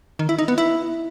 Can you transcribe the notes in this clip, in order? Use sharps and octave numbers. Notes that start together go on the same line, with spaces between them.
D#3
E4
D#4
B3
E4